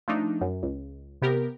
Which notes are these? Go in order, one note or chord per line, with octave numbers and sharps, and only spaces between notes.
F3 A3 D4 D#4
F#2
C#2
C3 B3 G4 A#4